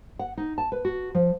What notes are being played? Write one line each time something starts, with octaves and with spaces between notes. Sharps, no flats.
F#5
D#4
A5
B4
F#4
F3